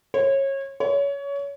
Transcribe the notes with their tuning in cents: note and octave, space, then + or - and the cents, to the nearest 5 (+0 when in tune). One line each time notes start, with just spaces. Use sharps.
C#5 -25
C#5 +25